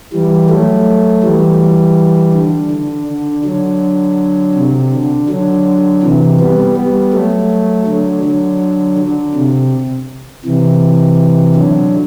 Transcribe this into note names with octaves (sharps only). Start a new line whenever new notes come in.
E3 G3
F#3 A3
E3 G3
D3
D3
D3
D3 F#3
C3
D3
D3 F#3
C3 E3
G3 B3
G3 B3
F#3 A3
D3 F#3
D3 F#3
D3
C3
C3 E3
D3 F#3